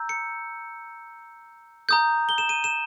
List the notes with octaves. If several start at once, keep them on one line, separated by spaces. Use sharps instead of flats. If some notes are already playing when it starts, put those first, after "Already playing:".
Already playing: A#5 E6 G6
C#7
A#5 D#6 G6
G7
E7
D#7
E7